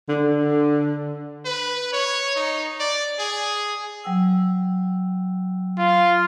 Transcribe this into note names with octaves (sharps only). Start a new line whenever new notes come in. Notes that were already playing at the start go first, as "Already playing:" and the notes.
D3
B4
C#5
D#4
D5
G#4
F#3 G5 E6
F4